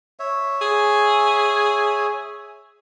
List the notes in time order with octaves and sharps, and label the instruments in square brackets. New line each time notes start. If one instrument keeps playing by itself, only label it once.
[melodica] C#5 E5
[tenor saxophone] G#4